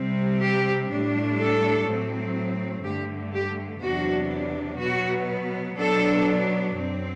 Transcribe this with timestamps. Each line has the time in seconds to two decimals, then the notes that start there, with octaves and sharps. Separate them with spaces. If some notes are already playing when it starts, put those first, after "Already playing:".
Already playing: C3 G3 C4
0.41 G4
0.90 A2 G3 D4
1.39 A4
1.87 A2 F#3 C4
2.84 G2 D3 A3 G4
3.34 G4
3.82 E2 C3 F#3 B3 D4 F#4
4.79 B2 F#3 B3 F#4
5.76 B2 F#3 B3 D4 A4
6.74 F#2 F#3 C4